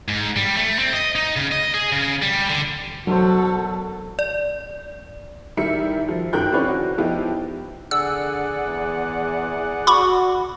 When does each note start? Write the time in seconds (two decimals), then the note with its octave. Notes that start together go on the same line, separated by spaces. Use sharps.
0.08 G#2
0.36 G3
0.57 A3
0.79 C4
0.93 D#5
1.15 D#4
1.36 C#3
1.52 D#5
1.74 G#4
1.92 C#3
2.22 G3
2.50 D3
3.07 E1 F#3 F#4 A4 C5
4.19 D5
5.57 D#3 E3 G3 A#4 E5 C#7
6.09 F3
6.33 G1 D#3 A#4 G5 F#6 G6
6.52 C4 C#4 E4 B4 C#5 D5
6.68 F#4
6.98 F3 B3 D#4 E4 G4
7.91 D3 G#4 D5 F#5 E6
8.67 E2
9.87 F#4 B5 C#6 D6